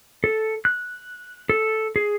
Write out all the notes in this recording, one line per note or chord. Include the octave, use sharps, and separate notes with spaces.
A4
F#6
A4
G#4